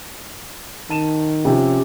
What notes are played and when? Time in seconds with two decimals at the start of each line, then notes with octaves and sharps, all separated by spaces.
0.90 D#3 A5 D#7 E7
1.45 C3 F3 C#4 G4